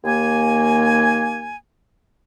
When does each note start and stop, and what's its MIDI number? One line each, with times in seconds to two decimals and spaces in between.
0.05 1.55 39
0.05 1.55 58
0.05 1.55 80